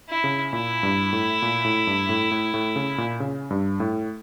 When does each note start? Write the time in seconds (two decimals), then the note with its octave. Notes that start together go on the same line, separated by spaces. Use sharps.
0.09 E4
0.24 C#3
0.53 A#2 E4
0.83 G2
1.13 A2
1.42 A#2
1.65 A2
1.87 G2
2.09 A2
2.31 A2
2.54 A2
2.76 C#3
2.98 A#2
3.20 C#3
3.50 G2
3.80 A2